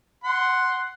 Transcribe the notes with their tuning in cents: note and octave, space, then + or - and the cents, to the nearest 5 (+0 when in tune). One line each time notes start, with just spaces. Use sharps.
F#5 +0 C6 +0